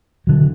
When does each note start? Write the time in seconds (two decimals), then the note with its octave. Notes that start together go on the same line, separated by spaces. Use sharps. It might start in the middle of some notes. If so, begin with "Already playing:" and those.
0.27 D3 F#3